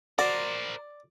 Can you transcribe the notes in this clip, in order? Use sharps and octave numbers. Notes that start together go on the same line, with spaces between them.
F#4 A#4 C5 D5